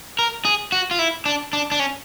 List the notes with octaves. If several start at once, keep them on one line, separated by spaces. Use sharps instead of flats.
A#4
G#4
F#4
F4
E4
D4
D4
D4
C#4